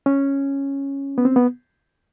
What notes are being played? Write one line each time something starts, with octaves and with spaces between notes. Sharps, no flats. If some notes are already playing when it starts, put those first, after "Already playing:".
C#4
B3
C4
B3